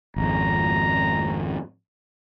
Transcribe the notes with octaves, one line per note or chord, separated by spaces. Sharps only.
G#1 F2 A#5